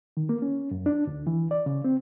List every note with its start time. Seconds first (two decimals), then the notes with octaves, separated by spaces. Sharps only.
0.17 D#3
0.29 A#3
0.42 C#4
0.71 F#2
0.86 D4
1.07 D2
1.27 E3
1.51 D5
1.66 C#3
1.84 C4